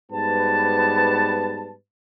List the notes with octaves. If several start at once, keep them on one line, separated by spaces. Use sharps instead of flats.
G#2 G3 B3 B4 A5